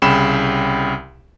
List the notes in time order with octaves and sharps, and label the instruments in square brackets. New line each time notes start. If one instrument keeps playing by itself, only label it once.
[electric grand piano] C2 C#3 G5 B5 E7